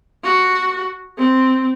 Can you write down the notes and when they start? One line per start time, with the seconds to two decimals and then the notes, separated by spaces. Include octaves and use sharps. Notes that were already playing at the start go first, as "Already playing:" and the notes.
0.24 F#4
1.18 C4